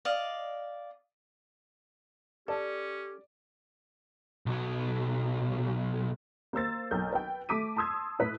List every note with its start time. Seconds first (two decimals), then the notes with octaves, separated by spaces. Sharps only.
0.05 D5 D#5 F5
2.48 C#4 G4 A4 D5
4.46 B1 F#3
6.53 A#3 C5 E6 A6
6.91 B1 A#4 G6
7.13 B4 G5
7.49 A3 D6 B6 D#7
7.77 A5 C6 D#6 E6 G#6
8.19 A2 B4 B6